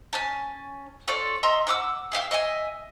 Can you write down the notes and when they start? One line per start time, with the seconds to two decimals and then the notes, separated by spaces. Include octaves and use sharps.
0.13 C#4 G#5 A5
1.08 F4 A4 C#5 D5
1.43 D#5 E5 A#5 C6
1.67 E5 F#5 D6 E6
2.12 G#4 E5 F5 G5
2.31 D#5 E5 G5 G#5